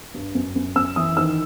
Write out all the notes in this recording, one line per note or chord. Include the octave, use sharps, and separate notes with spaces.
G2
F#2
F#2
F#2 E6
E3 D#6
D#3 E6